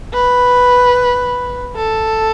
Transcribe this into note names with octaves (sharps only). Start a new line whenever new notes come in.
B4
A4